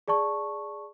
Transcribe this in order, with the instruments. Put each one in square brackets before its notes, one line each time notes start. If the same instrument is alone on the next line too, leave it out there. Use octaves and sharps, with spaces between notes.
[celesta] G#4 D5 A5 C#6